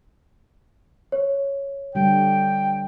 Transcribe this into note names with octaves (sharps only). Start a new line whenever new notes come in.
C#5
D3 G3 G5